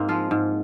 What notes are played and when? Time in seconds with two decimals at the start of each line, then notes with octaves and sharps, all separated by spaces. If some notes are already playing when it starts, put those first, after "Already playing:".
Already playing: G#2 A#3 C4
0.09 F3 G#3 F4
0.31 G#2